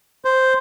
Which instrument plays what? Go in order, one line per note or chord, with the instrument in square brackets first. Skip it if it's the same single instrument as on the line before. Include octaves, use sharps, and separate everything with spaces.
[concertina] C5